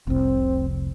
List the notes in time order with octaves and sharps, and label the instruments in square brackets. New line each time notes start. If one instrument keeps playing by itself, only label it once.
[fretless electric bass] F1 C2 [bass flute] C4